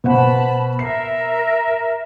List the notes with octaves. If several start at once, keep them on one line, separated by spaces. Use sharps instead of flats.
B2 C5 F#5 A5 B5
A#4 E5 C7